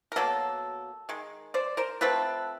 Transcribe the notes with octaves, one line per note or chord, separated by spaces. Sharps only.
A#4
B2 F#3 A#3 A4
D#3 G#3
C5 D5
A#4 C5
F3 A3 C4 A4 B4